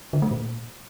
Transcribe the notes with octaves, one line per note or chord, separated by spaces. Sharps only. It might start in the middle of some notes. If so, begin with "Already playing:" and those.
D3
A3
A#2